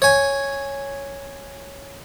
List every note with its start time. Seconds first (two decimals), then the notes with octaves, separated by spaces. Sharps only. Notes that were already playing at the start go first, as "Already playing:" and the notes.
0.02 C#5 G#5